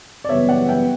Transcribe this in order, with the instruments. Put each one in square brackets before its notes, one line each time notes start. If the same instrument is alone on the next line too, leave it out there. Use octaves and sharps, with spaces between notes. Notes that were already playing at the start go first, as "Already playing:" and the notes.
[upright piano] D5
[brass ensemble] F#2 C#3 E3 G3 B3 [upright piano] C#5 E5
[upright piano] D5 F#5
E5 G5